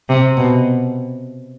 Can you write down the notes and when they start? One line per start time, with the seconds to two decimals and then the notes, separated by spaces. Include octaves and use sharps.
0.09 C3
0.37 B2